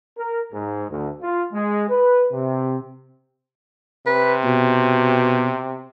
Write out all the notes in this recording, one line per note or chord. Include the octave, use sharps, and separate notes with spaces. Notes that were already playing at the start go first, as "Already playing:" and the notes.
A#4
G#2
D2
F4
G#3
B4
C3
C3 B4
B2